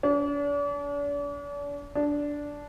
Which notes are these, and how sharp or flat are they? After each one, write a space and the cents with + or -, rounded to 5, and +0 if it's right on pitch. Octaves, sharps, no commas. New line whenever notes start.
D4 -40
D4 -10